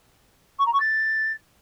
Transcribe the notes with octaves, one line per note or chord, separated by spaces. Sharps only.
C#6
A#5
C#6
A6